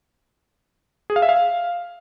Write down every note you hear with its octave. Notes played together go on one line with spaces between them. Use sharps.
G#4
F5
E5
F5